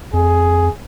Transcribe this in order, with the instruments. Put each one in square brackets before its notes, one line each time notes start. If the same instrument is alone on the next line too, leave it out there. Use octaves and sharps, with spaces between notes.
[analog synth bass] F2 [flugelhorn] G#4